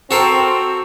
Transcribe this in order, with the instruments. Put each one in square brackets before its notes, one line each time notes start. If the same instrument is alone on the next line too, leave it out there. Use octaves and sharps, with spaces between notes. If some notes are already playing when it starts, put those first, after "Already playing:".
[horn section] C4 [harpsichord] F#4 A4 A#4